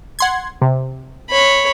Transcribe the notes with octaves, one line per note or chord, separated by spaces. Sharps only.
F#5 C6 G#6
C3
C#5 B5